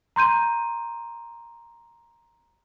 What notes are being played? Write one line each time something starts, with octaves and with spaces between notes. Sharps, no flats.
A#5 C6 G6 D#7